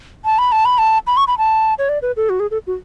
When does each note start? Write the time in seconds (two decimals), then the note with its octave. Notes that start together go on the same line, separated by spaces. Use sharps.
0.25 A5
0.38 B5
0.52 A5
0.65 B5
0.78 A5
1.07 B5
1.17 C#6
1.27 B5
1.38 A5
1.79 C#5
1.89 D5
2.02 B4
2.17 A4
2.29 F#4
2.40 G#4
2.51 A4
2.67 F#4